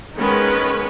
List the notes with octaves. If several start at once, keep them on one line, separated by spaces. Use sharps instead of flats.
D#3 G#3 B3 C#4 B4